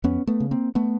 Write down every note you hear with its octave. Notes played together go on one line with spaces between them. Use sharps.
F2 B3 C#4
A3 B3
C#3
A#3 C4
A3 B3